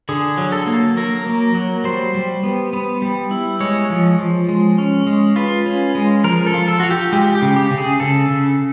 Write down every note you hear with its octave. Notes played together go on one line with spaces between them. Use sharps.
D3 G#4
F#3
A4
A#3
F#3 A#4
A#3
F#3
G3 C5
G3
B3
B3
G3
E4
G#3 C#5
F3
F3
G#3
C#4
G#3
F4 B4
C#4
G#3
F3 A#4
A4
F4
A4
F4 F#4
G4
G#3 G4
G4
C#3
G4
C#3
G#4
C#3 A4
C#3